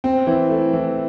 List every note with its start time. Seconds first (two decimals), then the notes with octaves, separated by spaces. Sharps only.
0.04 C4
0.27 E3
0.50 A3
0.73 E3